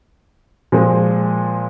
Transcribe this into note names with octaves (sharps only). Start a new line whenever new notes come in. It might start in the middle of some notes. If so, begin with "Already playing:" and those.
A#2 F3 G#3